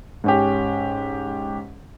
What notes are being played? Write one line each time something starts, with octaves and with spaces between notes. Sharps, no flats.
G#2 C#4 G4